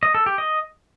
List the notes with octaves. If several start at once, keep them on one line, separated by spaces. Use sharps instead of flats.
D#5
A4
G4
D#5